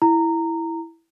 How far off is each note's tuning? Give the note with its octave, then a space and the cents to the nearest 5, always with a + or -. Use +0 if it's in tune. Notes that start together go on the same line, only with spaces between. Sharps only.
E4 +0 A#5 -15